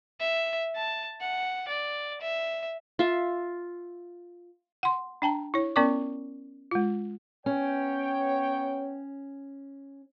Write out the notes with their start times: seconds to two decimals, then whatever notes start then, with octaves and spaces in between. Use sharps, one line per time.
0.20 E5
0.75 A5
1.21 F#5
1.68 D5
2.21 E5
2.99 F4 E5
4.83 F#5 C6
5.22 D4 G5 A5 A#5
5.54 E4 C#5
5.76 B3 C#4 A#4 D5 C#6 D6
6.71 G#3 F4
7.46 B3 C#4 C#5 G5